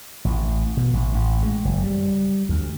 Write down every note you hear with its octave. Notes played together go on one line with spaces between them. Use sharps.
A1
B2
A1
A1
G#3
F#1
G3
D2